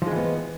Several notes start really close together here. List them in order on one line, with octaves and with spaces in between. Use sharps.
F3 G#3 E3 B3